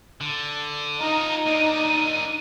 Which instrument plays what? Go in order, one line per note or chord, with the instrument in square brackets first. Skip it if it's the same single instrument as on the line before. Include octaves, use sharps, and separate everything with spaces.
[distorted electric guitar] D3
[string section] D#4 [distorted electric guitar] F4 D#5 [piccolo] A#5
[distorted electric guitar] A#3 D4 [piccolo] D#7